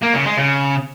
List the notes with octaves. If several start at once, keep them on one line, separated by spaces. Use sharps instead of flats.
A#3
C#3
G#3
C#3